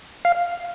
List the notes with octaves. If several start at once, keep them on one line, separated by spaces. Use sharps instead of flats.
F5